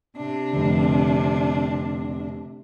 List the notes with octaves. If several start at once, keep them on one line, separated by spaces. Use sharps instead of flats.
C3 D4
F1 D3